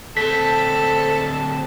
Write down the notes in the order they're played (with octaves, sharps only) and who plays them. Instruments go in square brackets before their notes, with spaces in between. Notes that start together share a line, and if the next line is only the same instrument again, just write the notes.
[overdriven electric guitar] D2 C4 [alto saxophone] A4 [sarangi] A5 [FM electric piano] B6